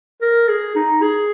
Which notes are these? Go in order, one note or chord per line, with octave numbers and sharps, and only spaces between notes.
A#4
G#4
D#4
G#4